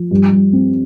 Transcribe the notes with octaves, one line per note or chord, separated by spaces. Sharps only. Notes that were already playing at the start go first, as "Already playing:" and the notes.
Already playing: F3
G2
G2
C4